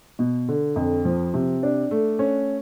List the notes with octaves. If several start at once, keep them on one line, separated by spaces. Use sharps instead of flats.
B2
D3
F2
F3
C3
D4
A3
C#4